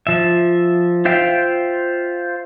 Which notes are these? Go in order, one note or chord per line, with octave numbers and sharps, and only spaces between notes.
F3 E5
F4 C5 E5 F5 G5